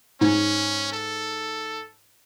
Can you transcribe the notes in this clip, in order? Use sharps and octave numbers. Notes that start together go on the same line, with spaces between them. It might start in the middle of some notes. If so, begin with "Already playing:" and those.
G#2 C#4
A4